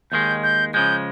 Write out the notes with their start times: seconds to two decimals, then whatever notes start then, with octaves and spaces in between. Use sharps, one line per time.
0.11 D#2 D#3 G#3 G6
0.43 G6
0.74 C#3 F3 G#3 G6